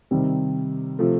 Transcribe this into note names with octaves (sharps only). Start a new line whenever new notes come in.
C3 D#3 G3 C4
C3 F3 A3